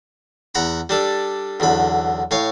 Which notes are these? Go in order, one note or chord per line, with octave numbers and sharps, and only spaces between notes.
E2 F#5 A#5 B5
G3 D4 A4
B1 E2 D3 B5
A2 C#5 F5